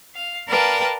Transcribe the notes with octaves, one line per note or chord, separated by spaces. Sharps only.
F5
A#4 B4 D5 F5 G5 A5